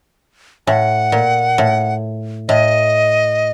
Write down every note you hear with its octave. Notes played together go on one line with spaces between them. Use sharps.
A2 F#5 G#5
A#2
A2
A2 D#5